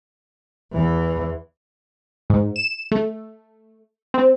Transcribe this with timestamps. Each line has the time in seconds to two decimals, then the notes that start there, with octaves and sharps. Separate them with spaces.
0.72 E2 E3
2.30 G#2
2.56 E7
2.92 A3
4.14 C4